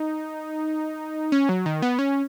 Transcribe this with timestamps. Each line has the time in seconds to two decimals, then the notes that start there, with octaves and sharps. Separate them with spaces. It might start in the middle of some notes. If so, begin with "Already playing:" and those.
Already playing: D#4
1.32 C#4
1.49 F#3
1.66 D#3
1.82 B3
1.99 C#4